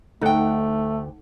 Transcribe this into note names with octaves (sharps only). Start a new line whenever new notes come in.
D2 A3 D#4 A4 F#5 G5